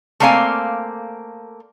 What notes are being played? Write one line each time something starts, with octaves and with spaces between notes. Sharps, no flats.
A3 A#3 C4 D5 F5 G#5